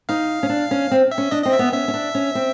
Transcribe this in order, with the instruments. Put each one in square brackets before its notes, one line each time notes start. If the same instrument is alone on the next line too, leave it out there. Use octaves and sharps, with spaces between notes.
[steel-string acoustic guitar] D#4 [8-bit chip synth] F5
[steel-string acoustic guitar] C#4
D4
C#4
C4
[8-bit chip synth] E5
[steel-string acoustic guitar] C#4
[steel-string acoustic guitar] D4 [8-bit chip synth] D#5
[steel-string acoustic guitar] C4 [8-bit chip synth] D#5
[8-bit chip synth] E5
[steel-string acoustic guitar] B3
[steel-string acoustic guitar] C#4 [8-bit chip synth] E5
[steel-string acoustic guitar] C#4
D4
C#4
C4